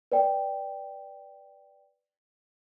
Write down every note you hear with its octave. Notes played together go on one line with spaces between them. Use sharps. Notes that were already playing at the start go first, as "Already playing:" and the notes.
B4 D5 G5